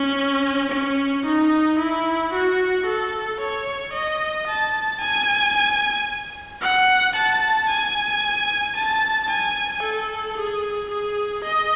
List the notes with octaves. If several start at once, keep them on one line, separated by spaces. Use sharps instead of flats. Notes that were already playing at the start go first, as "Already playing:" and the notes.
Already playing: C#4
C#4
D#4
E4
F#4
A4
C#5
D#5
A5
G#5
F#5
A5
G#5
A5
G#5
A4
G#4
G#4
D#5